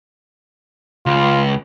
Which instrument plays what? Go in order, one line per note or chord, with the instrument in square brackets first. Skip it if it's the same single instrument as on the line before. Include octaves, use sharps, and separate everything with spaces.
[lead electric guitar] C#2 [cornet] F4